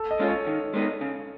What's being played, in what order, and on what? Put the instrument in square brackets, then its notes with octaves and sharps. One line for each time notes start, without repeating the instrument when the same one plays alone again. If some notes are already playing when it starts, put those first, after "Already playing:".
Already playing: [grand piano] A4
D#5
[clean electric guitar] G#3 C#4 F4
[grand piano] C#5
[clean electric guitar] D#3
G#3 B3 D#4
C#3